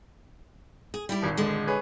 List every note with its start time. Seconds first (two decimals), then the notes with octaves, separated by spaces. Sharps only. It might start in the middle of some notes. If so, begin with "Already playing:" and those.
0.94 G#4
1.09 G3 E4 G4
1.22 D#1 G#1
1.37 D3 G#3
1.67 G#4 B4 C#5